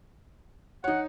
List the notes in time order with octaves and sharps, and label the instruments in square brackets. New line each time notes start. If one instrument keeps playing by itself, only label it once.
[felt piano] D#4 C#5 [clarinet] F#5